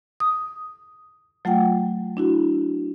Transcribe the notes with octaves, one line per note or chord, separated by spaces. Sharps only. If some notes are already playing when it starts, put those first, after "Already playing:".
D#6
F#3 A3 F4 F#5 G5
D4 E4 F#4